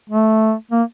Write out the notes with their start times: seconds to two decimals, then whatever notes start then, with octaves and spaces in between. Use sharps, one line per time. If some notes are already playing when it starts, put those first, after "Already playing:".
0.10 A3
0.71 A#3